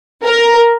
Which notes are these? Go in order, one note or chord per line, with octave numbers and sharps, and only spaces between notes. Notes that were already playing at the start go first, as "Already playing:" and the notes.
A#4